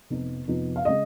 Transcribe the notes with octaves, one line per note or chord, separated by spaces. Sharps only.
F1 F2 F3 B3 D#4
F1 F2 F3 B3 D#4
F5
C#3 G#3 D#5